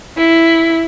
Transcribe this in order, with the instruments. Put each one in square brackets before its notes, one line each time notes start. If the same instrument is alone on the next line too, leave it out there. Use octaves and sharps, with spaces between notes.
[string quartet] E4